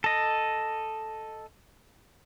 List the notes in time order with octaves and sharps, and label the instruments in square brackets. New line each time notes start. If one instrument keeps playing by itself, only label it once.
[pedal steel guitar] A4 D#5